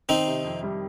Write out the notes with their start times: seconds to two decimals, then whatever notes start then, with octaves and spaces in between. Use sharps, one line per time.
0.09 D#3 C4 D#4
0.27 C3
0.44 F2
0.63 G3